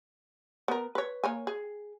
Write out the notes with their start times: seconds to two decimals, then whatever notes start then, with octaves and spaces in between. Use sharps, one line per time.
0.68 B3 A#4
0.95 B4 C#5
1.24 A#3 C#5 G#5
1.47 G#4